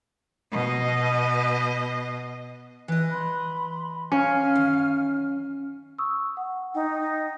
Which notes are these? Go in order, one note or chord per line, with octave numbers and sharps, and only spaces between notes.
B2 D#5
E3 D#5 F#6
B5 C6
C#4 F5 G#5 F6
F#2 D#3
C#6 D#6 E6
F#5
D#4 G5